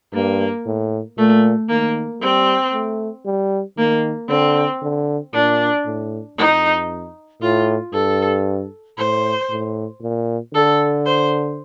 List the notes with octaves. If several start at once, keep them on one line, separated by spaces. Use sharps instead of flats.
G2 A#3
A2
A#2 A3
D#3 A#3
G3 C4
A3
G3
D#3 A#3
D3 C4
D3
A#2 D4
A2
F2 D#4
A2 F4
G2 A4
A2 C5
A2
A#2
D3 A4
C5